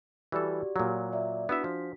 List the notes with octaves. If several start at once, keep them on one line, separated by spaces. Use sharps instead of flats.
E3 G3 F#4 G4 A4 D5
A#2 F#3
D5 E5
B3 D4 E4 F#4 E5 B6
F3